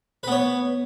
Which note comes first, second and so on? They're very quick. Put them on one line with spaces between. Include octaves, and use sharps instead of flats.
B4 B3 C#5